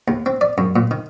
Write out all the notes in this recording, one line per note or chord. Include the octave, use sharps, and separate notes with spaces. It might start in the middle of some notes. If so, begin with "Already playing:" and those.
D#2
C4
D5
F#2
A#2
D#3